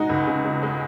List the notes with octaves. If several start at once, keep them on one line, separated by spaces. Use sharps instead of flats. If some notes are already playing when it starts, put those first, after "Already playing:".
Already playing: G#3 D#4 F#4
C#2
C#3
C#3
G#3